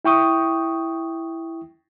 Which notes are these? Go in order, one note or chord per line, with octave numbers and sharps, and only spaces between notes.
E4 G5 C#6 D#6